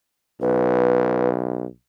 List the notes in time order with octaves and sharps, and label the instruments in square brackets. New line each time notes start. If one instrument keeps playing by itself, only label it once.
[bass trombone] B1 [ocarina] B4